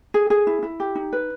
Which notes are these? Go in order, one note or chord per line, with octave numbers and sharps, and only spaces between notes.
G#4
G#4
E4
E4
G4
D#4
B4